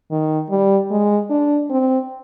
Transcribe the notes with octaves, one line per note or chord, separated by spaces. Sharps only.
D#3
G3
G#3
D4
C4